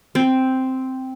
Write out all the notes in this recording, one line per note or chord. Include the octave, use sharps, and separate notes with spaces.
C4